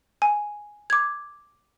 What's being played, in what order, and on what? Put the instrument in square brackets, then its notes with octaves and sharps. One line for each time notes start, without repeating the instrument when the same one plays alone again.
[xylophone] G#5
D6 G#6